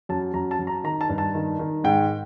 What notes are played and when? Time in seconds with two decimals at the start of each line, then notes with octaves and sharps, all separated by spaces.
0.09 F#2 A5
0.34 F#2 A#5
0.51 A5
0.59 F#2
0.67 A#5
0.84 D#3 A#5
1.01 A5
1.09 G2
1.18 A5
1.35 D#3
1.59 D#3
1.84 G#2 G5